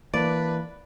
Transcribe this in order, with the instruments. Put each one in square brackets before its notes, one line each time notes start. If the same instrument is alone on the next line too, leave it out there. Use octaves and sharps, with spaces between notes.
[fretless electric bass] E3 A#3 [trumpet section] D4 B4 [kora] D5